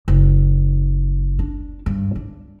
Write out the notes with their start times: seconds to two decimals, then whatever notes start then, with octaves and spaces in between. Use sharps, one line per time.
0.08 F#1
1.39 D4
1.86 G2
2.15 D4